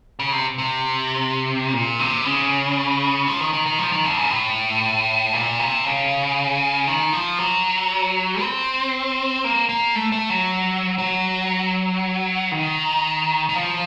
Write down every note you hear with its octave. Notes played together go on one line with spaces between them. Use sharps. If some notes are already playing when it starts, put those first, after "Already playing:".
C#3
C3
C3
A#2
C3
C#3
F3
D#3
D#3
D#3
F3
D#3
F2
F#2
A2
A#2
C3
C#3
D#3
F3
F#3
C4
A#3
A#3
A3
A3
F#3
F#3
D#3
D#3
F3